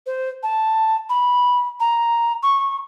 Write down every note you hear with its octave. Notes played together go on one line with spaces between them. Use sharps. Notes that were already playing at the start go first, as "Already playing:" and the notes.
C5
A5
B5
A#5
C#6